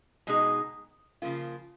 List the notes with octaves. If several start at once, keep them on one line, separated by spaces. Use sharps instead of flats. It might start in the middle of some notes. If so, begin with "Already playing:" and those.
B2 G#3 D#4 G#4
C#3 F3 A#3 F4